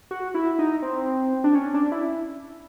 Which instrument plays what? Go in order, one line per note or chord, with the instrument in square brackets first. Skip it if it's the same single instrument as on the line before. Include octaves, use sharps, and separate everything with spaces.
[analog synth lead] F#4
E4
D#4
C4
D4
C#4
D4
E4